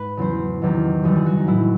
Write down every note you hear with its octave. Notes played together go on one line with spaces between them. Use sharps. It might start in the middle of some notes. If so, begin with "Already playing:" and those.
Already playing: G#2 B4
E2 C#3 F#3 C5
E2 C3 D#3 F#3
F#2 C#3 E3 G3 G#4
G#4
F#4
D#4
A2 F#3 E4